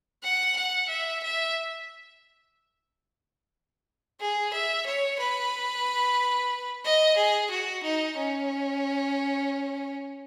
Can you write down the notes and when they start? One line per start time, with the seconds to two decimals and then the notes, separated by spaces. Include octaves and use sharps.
0.23 F#5
0.56 F#5
0.89 E5
1.23 E5
4.20 G#4
4.53 E5
4.86 C#5
5.19 B4
6.85 D#5
7.17 G#4
7.50 F#4
7.83 D#4
8.17 C#4